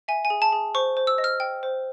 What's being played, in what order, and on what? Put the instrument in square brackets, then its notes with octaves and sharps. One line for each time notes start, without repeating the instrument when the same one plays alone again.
[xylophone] E5 G#5
G#5
G#4
A5
G#4
C5 C#6
C5
E6
D#5
F6
G5
C5